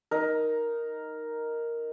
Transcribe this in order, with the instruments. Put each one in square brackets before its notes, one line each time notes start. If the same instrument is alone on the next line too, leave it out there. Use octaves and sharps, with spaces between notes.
[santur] D#4 A#4